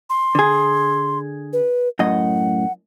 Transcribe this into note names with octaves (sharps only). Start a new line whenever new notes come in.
C6
D3 G#4
B4
F#2 A2 D#5 F#5